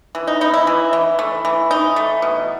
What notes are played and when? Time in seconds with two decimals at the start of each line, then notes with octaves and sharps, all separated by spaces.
0.15 E3
0.27 D#4
0.41 B3 D#4
0.54 E4
0.67 E3
0.93 E3
1.19 A3
1.45 E3
1.71 E3 D#4
1.96 A3
2.22 B2